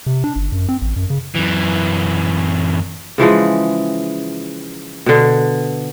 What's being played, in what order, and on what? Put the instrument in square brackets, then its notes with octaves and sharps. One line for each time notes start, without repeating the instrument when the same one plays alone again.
[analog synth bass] C3
D4
G1
F#2
C4
A1
F#2
C#3
[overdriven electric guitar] F#2 E3
[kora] C#3 E3 F3 G#3
B2 D3